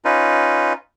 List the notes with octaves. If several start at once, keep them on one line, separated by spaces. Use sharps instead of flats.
C#4 D#4 F4 B4